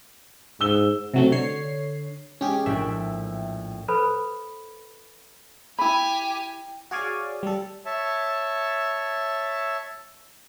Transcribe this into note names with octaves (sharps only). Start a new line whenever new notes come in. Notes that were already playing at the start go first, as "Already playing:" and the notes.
G#2 E6 G7
C3 F#3 A3
D3 C#5 C7
G#3 C#4 G4 G#4
A#1 A2 E5 G5
A4 B4 C5 B5
E4 G4 G#5 B5
F#4 G#4 C#5 D5 F5 G#5
G3 A4
C#5 E5 A5